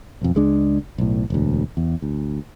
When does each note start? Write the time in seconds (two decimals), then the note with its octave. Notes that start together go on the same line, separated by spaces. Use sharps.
0.22 B1 F2
0.35 C#2 G#3 D4
0.98 B1 A2
1.30 E1 D2
1.77 E2
2.02 D2